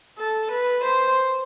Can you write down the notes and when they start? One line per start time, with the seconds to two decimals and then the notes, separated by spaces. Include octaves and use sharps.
0.18 A4
0.51 B4
0.83 C5